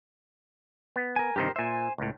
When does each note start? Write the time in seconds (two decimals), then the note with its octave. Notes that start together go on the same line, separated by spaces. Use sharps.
0.96 B3
1.16 A#4 G#5
1.36 G2 C3 D#3 G4 A#4 C5
1.56 A#2 C5 E5 G#5
1.98 C#2 A2